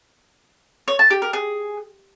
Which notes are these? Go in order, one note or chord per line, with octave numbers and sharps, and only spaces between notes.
C#5
A5
G4
A#4
G#4